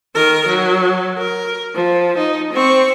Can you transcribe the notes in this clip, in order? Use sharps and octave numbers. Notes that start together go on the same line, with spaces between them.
D#3 A#4
F#3
A#4
F3
D#4
C4 C#6